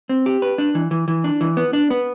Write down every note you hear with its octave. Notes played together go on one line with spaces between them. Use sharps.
C4
G4
B4
D4
E3
E3
E3
D4
E3
B3
D4
B3